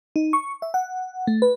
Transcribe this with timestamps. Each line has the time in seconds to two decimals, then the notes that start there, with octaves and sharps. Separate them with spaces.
0.16 D#4
0.33 C#6
0.62 E5
0.74 F#5
1.27 A3
1.42 B4